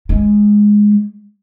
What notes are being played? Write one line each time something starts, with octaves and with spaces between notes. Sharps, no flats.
G#3